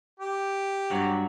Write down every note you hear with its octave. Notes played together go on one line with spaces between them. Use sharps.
G4
G2 F#3 F#4